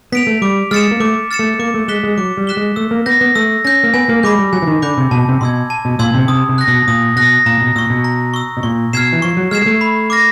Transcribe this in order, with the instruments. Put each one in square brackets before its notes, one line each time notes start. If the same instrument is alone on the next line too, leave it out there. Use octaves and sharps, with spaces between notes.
[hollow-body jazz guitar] B3 [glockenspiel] B6 D7 F7
[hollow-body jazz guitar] A3
[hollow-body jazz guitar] G3 [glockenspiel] D6
[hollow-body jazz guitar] G#3 [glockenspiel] F6 A6 C#7 E7
[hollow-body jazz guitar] A#3
[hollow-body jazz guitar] A3 [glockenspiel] D6
[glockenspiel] F6 A6 C#7 E7
[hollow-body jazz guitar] A3
[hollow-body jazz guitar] A#3 [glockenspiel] D6
[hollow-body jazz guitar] A3
[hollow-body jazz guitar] G#3 [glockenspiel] F#6 B6 E7 G7
[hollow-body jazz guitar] G#3
[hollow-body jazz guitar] F#3 [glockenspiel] D6
[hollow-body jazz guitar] G3
[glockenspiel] F#6 B6 E7 G7
[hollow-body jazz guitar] G#3
[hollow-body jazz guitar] A3 [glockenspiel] E6
[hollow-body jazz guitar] A#3
[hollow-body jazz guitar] B3 [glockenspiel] G6 A#6
[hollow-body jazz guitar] B3
[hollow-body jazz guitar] A3 [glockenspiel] E6
[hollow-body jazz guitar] C#4 [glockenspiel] G6 A#6
[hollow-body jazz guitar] A#3
[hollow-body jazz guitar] B3 [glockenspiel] G#5
[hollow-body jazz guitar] A#3
[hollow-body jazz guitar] G#3 [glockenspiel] B5 D6 G6
[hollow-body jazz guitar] G3
[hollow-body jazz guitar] F#3 [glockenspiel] G#5
[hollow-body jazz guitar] E3
D#3
[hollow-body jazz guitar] D3 [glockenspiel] B5 D6 G6
[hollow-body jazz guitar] C3
[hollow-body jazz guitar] B2 [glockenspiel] A5
[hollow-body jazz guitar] C3
[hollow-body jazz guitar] B2 [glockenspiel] C6 E6 G#6
[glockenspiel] A5
[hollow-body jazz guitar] B2
[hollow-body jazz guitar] A#2 [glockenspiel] C6 E6 G#6
[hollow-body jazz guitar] C3
[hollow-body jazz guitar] C3 [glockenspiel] D#6
[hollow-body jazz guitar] C3
[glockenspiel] F#6 A#6
[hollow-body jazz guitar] B2
[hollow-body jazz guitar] A#2 [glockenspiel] D#6
[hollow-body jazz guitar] B2 [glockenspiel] F#6 A#6
[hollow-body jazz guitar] A#2 [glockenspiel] A#5
[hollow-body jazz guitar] B2
[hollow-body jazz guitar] A#2 [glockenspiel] C#6 E6
[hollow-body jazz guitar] B2
[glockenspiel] A#5
C#6 E6
[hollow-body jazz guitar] B2
[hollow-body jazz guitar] A#2 [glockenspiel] C#6
[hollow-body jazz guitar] B2 [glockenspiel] F6 G#6 C7 E7
[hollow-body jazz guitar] E3
[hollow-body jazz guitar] F3 [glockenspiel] C#6
[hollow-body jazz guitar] F#3
[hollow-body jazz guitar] G#3 [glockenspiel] F6 G#6 C7 E7
[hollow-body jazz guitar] G#3
A3
[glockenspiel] B5
D6 F6 A#6